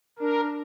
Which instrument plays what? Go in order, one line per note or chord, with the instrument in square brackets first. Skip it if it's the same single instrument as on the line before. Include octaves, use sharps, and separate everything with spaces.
[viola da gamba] D4 [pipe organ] A#4